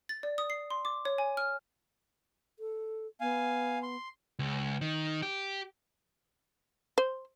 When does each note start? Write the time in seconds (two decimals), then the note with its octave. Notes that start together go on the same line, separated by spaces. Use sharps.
0.09 A6
0.23 D5
0.38 D#6
0.50 C7
0.70 C6
0.85 D6
1.05 C#5
1.18 G#5
1.37 F6
2.59 A4
3.21 B3 F5 G#5
3.83 C6
4.39 C#2
4.81 D#3
5.22 G4
6.98 C5